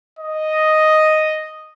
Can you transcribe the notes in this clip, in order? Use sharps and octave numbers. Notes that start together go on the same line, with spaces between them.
D#5